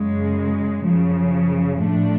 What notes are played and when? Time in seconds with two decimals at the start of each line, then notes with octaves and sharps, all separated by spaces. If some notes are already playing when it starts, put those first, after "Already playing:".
Already playing: F#2 C#3 G#3
0.87 F#2 C#3 F3
1.81 A2 F3 A3 D4